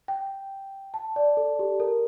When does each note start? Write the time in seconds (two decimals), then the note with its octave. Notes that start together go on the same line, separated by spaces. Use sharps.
0.08 G5
0.94 A5
1.16 D5
1.37 A4
1.59 G4
1.80 A#4